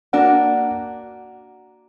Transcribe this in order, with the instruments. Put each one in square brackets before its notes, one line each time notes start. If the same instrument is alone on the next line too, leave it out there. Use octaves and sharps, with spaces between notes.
[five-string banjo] A#3 D4 F#4 [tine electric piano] F#5